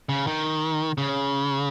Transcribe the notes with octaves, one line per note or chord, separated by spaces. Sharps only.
C#3
D#3
C#3